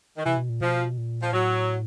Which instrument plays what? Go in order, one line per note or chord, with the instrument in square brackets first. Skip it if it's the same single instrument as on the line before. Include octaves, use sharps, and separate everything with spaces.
[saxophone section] D#3
[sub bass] C3 [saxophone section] E3
[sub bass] B2
A#2
[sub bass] B2 [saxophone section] F3
[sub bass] A#2
[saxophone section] F3
[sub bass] A2 [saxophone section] F#3